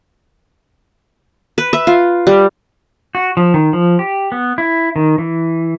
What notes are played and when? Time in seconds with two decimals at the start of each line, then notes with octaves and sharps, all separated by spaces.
1.58 B4
1.73 E5
1.87 F4
2.27 G3
3.15 F#4
3.37 F3
3.54 D#3
3.73 F3
3.99 G4
4.32 B3
4.58 E4
4.96 D#3
5.18 E3